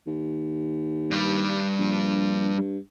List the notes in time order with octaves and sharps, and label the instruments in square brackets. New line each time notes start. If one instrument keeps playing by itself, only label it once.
[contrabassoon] D#2
[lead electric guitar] G2 G3
[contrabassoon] A#1
G2